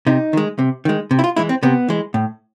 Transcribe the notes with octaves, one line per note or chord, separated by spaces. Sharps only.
C3 D#4
D#3 G#3
C3
D#3 G#3
C3
E4
F4
E3 G#3 E4
C4
C3 B3
E3 G#3
A2